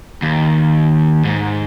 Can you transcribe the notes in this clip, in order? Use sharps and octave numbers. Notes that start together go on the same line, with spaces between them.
D#2
G#2